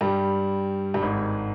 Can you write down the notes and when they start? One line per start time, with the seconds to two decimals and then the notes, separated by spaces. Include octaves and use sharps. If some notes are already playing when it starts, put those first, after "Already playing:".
0.01 G2 G3
0.94 G2
1.03 G#1 G#2